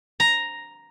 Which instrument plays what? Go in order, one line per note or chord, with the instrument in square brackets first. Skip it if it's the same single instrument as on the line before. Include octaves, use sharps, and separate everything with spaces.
[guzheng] A#5